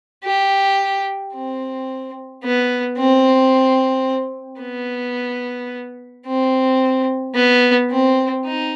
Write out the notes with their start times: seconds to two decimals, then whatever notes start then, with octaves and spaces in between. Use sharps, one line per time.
0.24 G4
1.34 C4
2.44 B3
2.98 C4
4.61 B3
6.26 C4
7.35 B3
7.90 C4
8.45 D#4